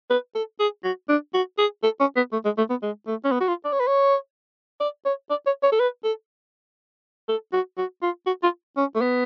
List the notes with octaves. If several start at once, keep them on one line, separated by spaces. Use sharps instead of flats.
B4
A4
G#4
F#4
D4
F#4
G#4
A4
C#4
B3
A3
G#3
A3
B3
G#3
A3
C#4
B3
F#4
F4
D5
C#5
B4
C#5
D5
C#5
D5
C#5
C#5
A4
B4
A4
A4
F#4
F#4
F4
F#4
F4
C#4
A3
B3